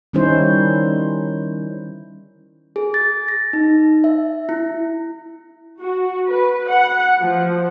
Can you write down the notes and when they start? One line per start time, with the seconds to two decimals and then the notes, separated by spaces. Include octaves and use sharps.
0.13 D#3 G3 C#4 D#4 E4 C5
2.76 G#4
2.94 A6
3.28 A#6
3.53 D#4
4.04 E5
4.49 E4
5.80 F#4
6.27 B4
6.69 F#5
7.20 F3